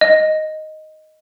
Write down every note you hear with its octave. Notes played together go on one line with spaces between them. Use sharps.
D#5